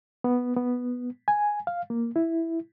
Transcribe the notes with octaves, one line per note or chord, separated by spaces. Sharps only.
B3
B3
G#5
F5
A#3
E4